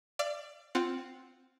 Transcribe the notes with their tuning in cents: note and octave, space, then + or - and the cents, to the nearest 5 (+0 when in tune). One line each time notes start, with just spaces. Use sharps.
D5 +10 F5 -45
C4 +0 F4 +0 F#5 +0